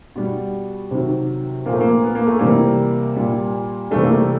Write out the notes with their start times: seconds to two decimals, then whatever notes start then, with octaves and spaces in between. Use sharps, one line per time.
0.15 B2 G3
0.91 C3 D#3 F#3
1.66 A#2 F3 A#3
1.73 A3
1.80 A#3
2.03 B3
2.15 A#3
2.27 A3
2.39 C3 E3 G3 A#3
3.16 A#2 G3
3.91 C3 E3 G3 A3
4.03 A#3
4.13 A3